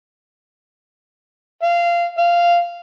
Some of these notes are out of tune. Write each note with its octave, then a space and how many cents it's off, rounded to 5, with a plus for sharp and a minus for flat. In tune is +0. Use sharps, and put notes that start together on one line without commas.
F5 -20
F5 -10